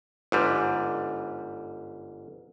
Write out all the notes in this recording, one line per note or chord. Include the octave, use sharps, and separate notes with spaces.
G1 G#2 G3